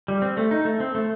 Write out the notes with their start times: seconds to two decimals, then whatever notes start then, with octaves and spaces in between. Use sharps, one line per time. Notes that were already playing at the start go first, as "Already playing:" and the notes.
0.08 G3
0.22 C4
0.37 A3
0.51 D#4
0.65 A3
0.80 C4
0.95 A3